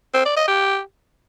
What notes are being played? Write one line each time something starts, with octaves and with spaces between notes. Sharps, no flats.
C4
D5
D#5
G4